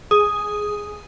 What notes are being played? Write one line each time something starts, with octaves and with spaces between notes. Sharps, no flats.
G#4 D#6